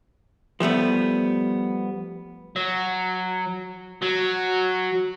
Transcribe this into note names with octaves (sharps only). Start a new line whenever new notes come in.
F3 G3 A3 B3
F#3
F#3